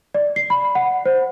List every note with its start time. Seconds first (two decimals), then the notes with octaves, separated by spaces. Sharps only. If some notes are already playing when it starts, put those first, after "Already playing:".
0.14 D5
0.36 C7
0.50 B5
0.75 F#5
1.06 C5